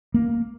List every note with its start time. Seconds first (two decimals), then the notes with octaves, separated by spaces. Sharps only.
0.14 A#3